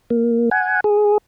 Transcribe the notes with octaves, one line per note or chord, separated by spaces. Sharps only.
A#3
F#5 G#5
G#4